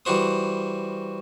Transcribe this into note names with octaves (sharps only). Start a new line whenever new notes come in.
E3 G3 F#4 C5 D#6